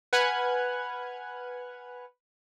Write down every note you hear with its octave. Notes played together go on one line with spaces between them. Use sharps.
B4 F#5 G#5 F6 F#6 G#6